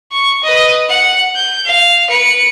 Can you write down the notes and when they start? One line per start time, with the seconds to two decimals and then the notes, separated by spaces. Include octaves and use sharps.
0.12 C#6
0.44 B4 D#5
0.89 F#5
1.35 G6
1.66 F5
2.10 B4 C#7